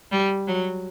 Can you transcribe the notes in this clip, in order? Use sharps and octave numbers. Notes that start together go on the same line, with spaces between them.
G3
F#3